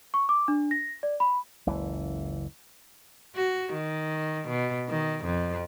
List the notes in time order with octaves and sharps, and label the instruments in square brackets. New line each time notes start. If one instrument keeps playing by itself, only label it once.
[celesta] C#6
D6
D4
A#6
D5
B5
[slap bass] F#1 C#2 E3
[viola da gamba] F#4
D#3
B2
D#3
F2